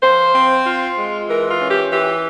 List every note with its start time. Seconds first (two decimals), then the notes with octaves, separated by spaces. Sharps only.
0.02 F3 C5
0.34 C4
0.66 F4
0.97 G#3
1.28 E3 A#4
1.50 F4
1.61 C#4
1.71 G4
1.92 E3 G4